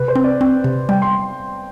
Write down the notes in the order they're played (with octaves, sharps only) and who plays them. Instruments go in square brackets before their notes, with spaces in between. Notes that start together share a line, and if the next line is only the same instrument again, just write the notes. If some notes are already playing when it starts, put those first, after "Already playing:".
Already playing: [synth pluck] C3 [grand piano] B4
[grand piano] C5
[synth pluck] C4
[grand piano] D5
[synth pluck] C4
C3
[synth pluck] G3 [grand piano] G5
[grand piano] C6